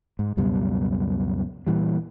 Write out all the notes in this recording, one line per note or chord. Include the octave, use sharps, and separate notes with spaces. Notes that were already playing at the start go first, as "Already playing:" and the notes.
G#2
C#2 F#2 B2 G3
A#2 E3 G3